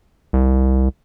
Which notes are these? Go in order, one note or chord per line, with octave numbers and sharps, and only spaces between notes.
C2